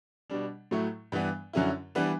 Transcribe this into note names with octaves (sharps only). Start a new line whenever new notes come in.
B2 G3 D4
A2 F#3 A3 E4
G2 E3 B3 D4
F#2 D3 F#3 C#4 E4
E3 G3 B3 D4